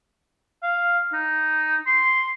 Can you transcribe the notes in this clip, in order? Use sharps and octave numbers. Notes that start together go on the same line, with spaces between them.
F5
D#4
C6